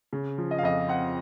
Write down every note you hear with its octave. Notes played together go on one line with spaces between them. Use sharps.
C#3
F3
D#5
F5
F2 D#5
C4 F#5